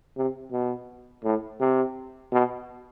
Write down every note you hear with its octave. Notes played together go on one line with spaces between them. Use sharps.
C3
B2
A2
C3
B2